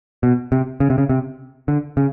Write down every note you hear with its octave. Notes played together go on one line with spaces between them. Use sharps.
B2
C3
C#3
C3
C#3
C3
D3
C#3